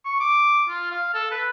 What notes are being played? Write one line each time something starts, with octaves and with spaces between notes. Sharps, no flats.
C#6
D6
F4
F5
A4
B4